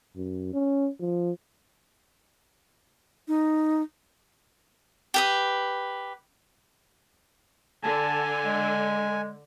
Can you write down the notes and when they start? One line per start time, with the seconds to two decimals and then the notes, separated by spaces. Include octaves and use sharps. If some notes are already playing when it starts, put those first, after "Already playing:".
0.16 F#2
0.54 C#4
1.00 F3
3.28 D#4
5.14 G4 B4 D#6
7.83 D3 G#5 A5
8.45 G#3